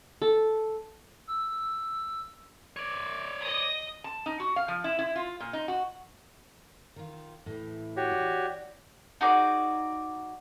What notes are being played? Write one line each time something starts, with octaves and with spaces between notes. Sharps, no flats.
A4
E6
C#5 D5
D#5 D#6
A5
D#4
F#4
F5
F3
E4
E4
F4
A#2
D#4
F#4
D#3 F4
A2 E3
F#4 G4 C#5
D5
D#4 F#4 G#4 D5